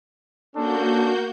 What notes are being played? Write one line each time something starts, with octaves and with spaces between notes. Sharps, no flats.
A#3 C#4 D4 F#4 A4 G6